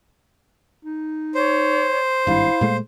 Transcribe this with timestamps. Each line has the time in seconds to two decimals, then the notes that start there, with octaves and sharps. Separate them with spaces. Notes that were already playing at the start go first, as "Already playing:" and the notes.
0.85 D#4
1.35 C5 C#5
2.27 G#1 G2 E4 F5
2.61 A#2 G#3 A3